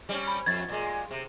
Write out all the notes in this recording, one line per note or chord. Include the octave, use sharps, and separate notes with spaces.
G3 C4 C#4
B5
F2 G#6 A6
A#2 G#3
C3